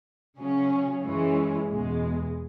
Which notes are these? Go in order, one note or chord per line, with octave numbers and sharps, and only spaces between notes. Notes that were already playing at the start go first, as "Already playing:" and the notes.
C#3 F#3 C#4
F#2 E3 G#3 C#4
E2 B2 G#3